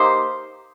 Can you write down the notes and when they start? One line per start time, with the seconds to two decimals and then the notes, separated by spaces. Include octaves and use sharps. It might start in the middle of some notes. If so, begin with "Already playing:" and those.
Already playing: A#3 D#4 G4 C5